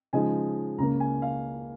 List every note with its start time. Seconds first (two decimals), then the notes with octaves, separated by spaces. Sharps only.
0.13 C#3 F3 G#3 D#4 G#5
0.78 C#2 C#3 A#3 A#5
1.00 G#5
1.22 F5